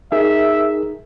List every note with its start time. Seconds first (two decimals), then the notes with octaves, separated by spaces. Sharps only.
0.12 D#4 G#4 A#4 E5